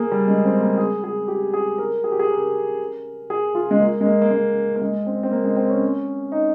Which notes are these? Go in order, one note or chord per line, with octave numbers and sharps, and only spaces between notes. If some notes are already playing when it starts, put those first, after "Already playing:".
Already playing: A#3 G#4
G3
G#3
C4
A#3
G#4
G#4
G4
G#4
A#4
G#4
G4
G#4
A#4
G#4
F4
G#3
A#3
G#3
A#3
A#3
G#3
A#3
G#3
C4
C4
A#3
G#3
C4
C#4
D#4